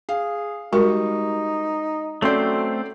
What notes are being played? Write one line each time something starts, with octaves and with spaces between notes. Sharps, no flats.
G#4 F5
G3 G#3 D#4 F#4 A#4 C#6
F#3 A3 C4 C#4 A4 C5 D5